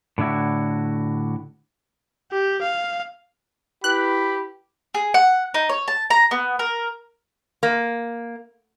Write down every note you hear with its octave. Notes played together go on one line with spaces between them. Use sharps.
A2 D3 D4 E4 F#4
G4
F5
E4 G4 B4 B5 F#6
G#4
F#5
D#4
C#5
A5
A#5
B3
A#4
A#3